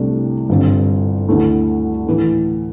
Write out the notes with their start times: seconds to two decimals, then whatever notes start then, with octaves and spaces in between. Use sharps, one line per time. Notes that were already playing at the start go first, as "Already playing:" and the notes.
Already playing: C2 C3 A3 D4
0.49 G1 G2 D3 C4
1.28 D2 D3 A3 E4
2.07 A2 E3 A3